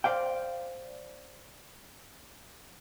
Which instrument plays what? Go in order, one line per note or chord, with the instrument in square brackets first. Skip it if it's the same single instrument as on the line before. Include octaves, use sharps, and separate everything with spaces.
[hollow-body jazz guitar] C5 D5 F5 G5